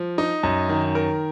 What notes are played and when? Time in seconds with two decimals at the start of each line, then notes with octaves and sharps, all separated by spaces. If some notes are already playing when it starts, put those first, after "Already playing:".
Already playing: F3
0.18 D#4
0.43 F#2
0.69 D#3
0.95 A#4